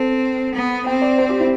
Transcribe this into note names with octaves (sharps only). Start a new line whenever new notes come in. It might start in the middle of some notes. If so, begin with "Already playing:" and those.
Already playing: C4 A4
B3
C4 G5
D5
C5
G4
E4